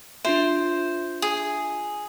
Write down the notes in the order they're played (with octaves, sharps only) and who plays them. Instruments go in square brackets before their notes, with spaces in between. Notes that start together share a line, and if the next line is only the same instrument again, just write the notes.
[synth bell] D4 F4 E5 [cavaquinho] C5
[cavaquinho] G#4